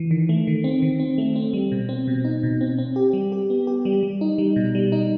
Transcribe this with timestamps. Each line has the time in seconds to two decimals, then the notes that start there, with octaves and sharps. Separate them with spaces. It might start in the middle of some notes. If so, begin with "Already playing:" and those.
Already playing: E3
0.11 D#3
0.29 A3
0.47 D#3
0.64 C4
0.82 D#3
1.00 C4
1.18 A3
1.36 C4
1.53 G3
1.72 B2
1.89 C4
2.08 B2
2.25 D#4
2.43 B2
2.61 C4
2.79 C4
2.96 G4
3.13 G3
3.32 G4
3.50 B3
3.67 G4
3.85 G3
4.03 G3
4.21 D#4
4.38 G3
4.56 B2
4.75 G3
4.92 D#4